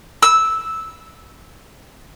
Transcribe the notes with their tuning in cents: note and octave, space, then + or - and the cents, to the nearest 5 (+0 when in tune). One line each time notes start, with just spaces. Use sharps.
E6 -10